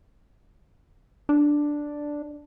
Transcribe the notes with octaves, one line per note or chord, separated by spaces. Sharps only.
D4